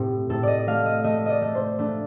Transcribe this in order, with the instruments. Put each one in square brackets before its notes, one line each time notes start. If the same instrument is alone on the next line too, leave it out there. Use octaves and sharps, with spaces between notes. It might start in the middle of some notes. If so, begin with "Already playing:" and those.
Already playing: [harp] A2 C4 G4
A2 A4
D5 D#5
A3 F5
D#5
A3 D#5
D5 D#5
A3
C5
A3 D4